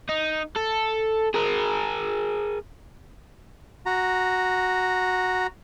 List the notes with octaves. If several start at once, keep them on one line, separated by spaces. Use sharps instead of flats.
D#4
A4
G#4 A#4
F#4 A#5